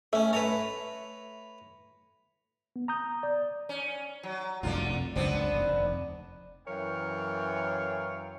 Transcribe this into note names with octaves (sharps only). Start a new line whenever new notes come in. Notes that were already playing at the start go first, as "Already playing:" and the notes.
A3 C#4 E5
A3 B4 C#5 A#5
B3
A#5 D#6 G6
D5
C#4
F#3
F1 C2 F#2 D3 F4
F#1 C#2 F#3 B3 C4 D4
F1 D#2
F#2 E3 A#4 C#5 F5 G5